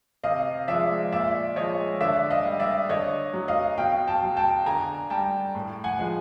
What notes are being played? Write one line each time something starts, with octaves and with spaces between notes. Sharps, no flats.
C3 D#5 F5
F3 G#3 D5 E5
A#2 D5 E5
F3 G#3 C#5 D#5
D3 D5 E5
D#5 F5
G3
D5 E5
D3 C#5 D#5
F#3
D#5 F5
B2 F5 G5
G5 A5
F#3
G5 A5
D3 G#5 A#5
G3 G5 A5
A2
F#5 G#5
F3 G#3